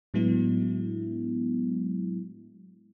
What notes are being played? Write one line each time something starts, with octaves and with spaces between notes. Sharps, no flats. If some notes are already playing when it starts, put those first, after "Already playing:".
A2 F#3 G#3 B3 D4 E4